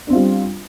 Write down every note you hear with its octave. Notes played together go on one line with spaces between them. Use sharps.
G3 C4 D4 F4